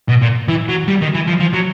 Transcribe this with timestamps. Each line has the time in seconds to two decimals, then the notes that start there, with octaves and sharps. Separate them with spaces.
0.09 B2
0.22 A#2
0.48 E3
0.68 F#3
0.88 G3
1.01 D#3
1.14 E3
1.27 F3
1.40 F3
1.53 F#3